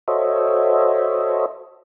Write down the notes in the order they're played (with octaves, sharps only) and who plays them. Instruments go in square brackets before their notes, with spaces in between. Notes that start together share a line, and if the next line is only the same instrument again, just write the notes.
[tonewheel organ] F#4 A4 C5 C#5 D#5 E5